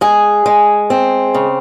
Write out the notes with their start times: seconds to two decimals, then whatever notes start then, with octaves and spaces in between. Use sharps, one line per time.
0.01 G#3 G#4
0.46 G#3
0.90 C4
1.34 C#3